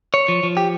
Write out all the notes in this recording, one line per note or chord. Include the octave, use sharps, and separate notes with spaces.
C#5
F3
F3
G4